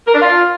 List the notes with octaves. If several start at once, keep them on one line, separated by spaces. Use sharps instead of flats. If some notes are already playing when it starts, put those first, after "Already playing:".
A#4
D4
F4